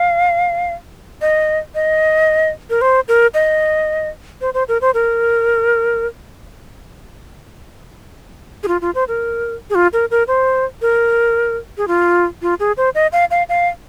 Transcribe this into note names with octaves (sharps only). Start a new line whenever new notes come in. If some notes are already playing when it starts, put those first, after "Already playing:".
Already playing: F5
D#5
D#5
A#4
C5
A#4
D#5
C5
C5
A#4
C5
A#4
G#4
F4
F4
C5
A#4
G#4
F4
A#4
A#4
C5
A#4
G#4
F4
F4
G#4
C5
D#5
F5
F5
F5